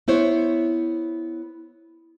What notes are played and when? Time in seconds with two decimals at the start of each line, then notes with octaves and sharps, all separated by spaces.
0.08 B3 E4 C5 C#5